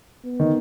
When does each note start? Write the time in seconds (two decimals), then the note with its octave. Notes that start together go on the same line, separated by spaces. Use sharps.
0.25 B3
0.40 D#3